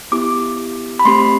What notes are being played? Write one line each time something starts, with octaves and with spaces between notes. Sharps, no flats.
B3 E4 G4 D6
B5
A3 C4 G4 C6